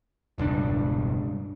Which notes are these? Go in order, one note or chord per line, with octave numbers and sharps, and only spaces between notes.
E1 C#2 G2 D4